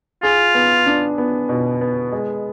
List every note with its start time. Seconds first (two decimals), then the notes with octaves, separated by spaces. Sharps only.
0.23 F4 G#4
0.55 B3
0.86 D4
1.18 B3
1.49 B2
1.81 B3
2.13 G#3